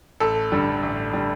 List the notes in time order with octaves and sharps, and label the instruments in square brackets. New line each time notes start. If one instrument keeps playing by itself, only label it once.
[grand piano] A1 A4
G2 D3 G3
A1
D3 G3